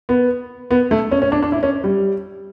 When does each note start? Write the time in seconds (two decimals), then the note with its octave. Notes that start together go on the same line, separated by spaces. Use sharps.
0.09 B3
0.71 B3
0.91 A3
1.11 C#4
1.22 C#4
1.32 D4
1.43 D4
1.52 E4
1.63 C#4
1.84 G3